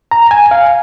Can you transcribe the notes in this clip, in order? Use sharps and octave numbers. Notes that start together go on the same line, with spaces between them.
A#5
G#5
F5